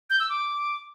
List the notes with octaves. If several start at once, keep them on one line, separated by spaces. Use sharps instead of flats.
G6
E6
D6